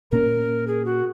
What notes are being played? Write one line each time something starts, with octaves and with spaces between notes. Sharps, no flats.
A#2 A#3 C#4 A#4
G#4
F#4